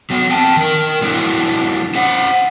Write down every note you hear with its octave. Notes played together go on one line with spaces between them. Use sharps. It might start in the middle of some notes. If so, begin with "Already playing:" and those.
F#3 B3
C4 G5 A5
D#3 A#4
F#3 G#3 D4 E4 B4
C#4 C5 F#5